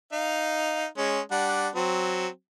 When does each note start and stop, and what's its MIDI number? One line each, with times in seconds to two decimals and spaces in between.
0.12 0.85 63
0.12 0.85 77
0.97 1.21 56
0.97 1.21 61
1.31 1.68 55
1.31 1.68 62
1.31 1.68 78
1.75 2.28 54
1.75 2.28 60